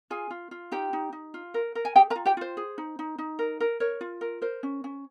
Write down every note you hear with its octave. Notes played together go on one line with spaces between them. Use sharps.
F4 G#4 G#5
F4
F4
D#4 G4 G5
D#4
D#4
F4
A#4
A#4
G#5
G4 G#4 G5
A#4 A#5
F4
G4 G5
F4 C5
G#4
D#4
D#4
D#4
A#4
A#4
A#4 C#5
F4
A#4
A#4 C5
C#4
C#4